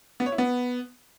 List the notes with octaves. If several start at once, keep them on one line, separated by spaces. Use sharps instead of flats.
B3
C#5
E4
B3